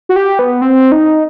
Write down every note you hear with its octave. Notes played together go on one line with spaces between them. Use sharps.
F#4
G4
B3
C4
D#4